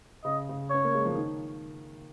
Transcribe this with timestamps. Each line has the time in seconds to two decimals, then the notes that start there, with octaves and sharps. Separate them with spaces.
0.24 C#3 D#5
0.49 C#3
0.70 C#4 C#5
0.84 A#3
0.94 G#3
1.05 F3
1.15 D#3